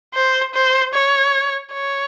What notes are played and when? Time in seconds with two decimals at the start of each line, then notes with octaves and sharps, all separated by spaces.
0.14 C5
0.54 C5
0.94 C#5
1.73 C#5